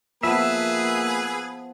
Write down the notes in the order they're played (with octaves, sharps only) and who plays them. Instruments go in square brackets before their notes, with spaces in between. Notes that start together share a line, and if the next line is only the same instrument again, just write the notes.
[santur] F3 B3 [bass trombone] A#3 [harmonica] G#4 B4 [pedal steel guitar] E5